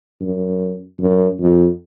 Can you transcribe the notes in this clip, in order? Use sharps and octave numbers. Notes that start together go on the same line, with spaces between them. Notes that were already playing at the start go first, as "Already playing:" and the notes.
F#2
F#2
F2